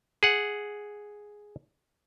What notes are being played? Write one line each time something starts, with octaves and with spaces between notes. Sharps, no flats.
G#4 F#5